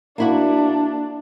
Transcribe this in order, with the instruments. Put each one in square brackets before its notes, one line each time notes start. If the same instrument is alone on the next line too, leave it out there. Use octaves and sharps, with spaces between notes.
[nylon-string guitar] A#3 E4 F#4 [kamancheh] D4